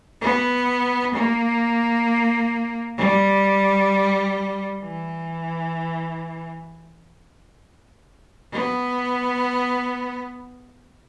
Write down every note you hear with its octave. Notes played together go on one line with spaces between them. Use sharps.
B3
A#3
G3
E3
B3